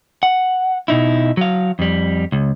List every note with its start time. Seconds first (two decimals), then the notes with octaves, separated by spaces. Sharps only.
0.23 F#5
0.88 B2 D#4 E4
1.37 F#3 F5
1.79 F2 G3
2.32 C#2